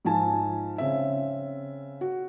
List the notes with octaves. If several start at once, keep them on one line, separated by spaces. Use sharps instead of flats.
G#2 F3 G#5 A5
C#3 C4 E5
F#4